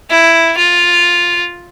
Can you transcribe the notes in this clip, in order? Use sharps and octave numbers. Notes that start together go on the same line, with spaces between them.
E4
F4